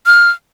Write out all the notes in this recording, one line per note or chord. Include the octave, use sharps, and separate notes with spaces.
F6